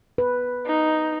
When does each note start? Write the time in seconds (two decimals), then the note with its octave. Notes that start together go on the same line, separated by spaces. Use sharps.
0.18 B4
0.66 D#4